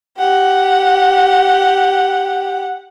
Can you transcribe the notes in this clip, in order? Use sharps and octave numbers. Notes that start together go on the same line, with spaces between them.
G4 F#5